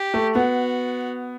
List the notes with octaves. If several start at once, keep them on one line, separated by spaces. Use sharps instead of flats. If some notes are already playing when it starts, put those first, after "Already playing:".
Already playing: G4
A3
B3 F#4